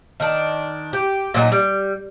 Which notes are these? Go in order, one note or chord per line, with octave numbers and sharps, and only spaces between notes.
D#3 D4
G4
A#2 F#3 D#4
G3